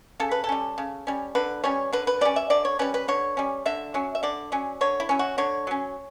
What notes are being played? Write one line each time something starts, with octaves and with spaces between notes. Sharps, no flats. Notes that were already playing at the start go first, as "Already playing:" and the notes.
C#3 A4
B4
A4
G3 C#4
C#3
G3 C#4
D3 B4
G3 C#4 C#5
D3 B4
B4
G3 C#4 D5
E5
D3 D5
C#5
G3 C#4 B4
B4
D3 C#5
G3 C#4
D3 E5
F#3 C#4
E5
D3 D5
F#3 C#4
D3 C#5
E4
F#3 C#4
F#4
D3 C#5
F#3 C#4